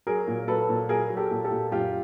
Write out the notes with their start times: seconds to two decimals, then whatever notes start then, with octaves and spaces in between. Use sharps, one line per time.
0.07 F#3 G#4 A#4
0.28 A#2
0.48 F#3 A4 B4
0.69 A#2
0.89 F#3 G#4 A#4
1.10 F#3
1.17 G4 A4
1.31 A#2
1.44 G4 A4
1.51 A#2
1.72 F#2 F4 G4